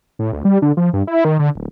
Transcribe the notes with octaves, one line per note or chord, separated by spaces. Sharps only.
A2
D2
G3
D3
F3
G2
E4
D#3
D3
D1